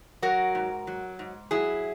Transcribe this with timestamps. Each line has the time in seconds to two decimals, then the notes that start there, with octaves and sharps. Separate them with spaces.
0.22 F#3 F#4 A#4
0.55 G#2
0.87 F#3
1.19 G#2
1.51 F#3 E4 G#4